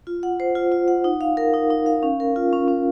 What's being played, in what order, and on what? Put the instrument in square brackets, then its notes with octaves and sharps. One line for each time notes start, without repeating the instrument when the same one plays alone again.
[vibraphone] F4
F#5
C5
F4
F4
F#5
D#4
F5
A#4
D#4
D#4
F5
C#4
A#4
F4
C#4
C#4